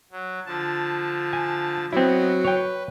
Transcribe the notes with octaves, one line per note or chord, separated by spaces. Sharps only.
F#3
D3 F3 A5
G#5
F#3 B3 C4 E4 D#5
B4 C#5 G5